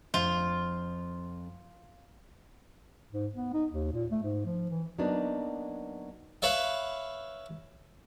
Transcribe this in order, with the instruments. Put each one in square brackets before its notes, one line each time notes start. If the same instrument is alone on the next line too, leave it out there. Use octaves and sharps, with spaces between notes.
[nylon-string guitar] F2 [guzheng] F4
[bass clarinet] G#2
B3
D#4
D#2
A#2
A3
G#2
F3
E3
[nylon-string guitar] F#3 A#3 B3 D4 D#4
[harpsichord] B4 C#5 E5 F5